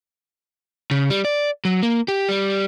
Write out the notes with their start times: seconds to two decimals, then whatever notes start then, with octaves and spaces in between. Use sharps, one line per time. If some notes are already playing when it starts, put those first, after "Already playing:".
0.91 C#3
1.10 G3
1.25 D5
1.65 F#3
1.83 A#3
2.08 G4
2.29 G3